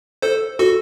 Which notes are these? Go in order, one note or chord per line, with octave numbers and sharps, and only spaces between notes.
A4 C5
F#4 A4